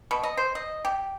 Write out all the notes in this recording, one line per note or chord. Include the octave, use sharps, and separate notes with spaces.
B2
D#5
C5
D#5
G4